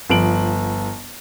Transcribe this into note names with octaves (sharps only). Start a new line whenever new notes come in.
G1 F3 D7 F#7